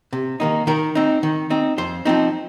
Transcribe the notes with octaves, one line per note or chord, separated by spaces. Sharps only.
C3
D#3 A#3 D#4
D#3 A#4
C4 D#4
D#3
C4 D#4
F2 C5
F3 C4 D#4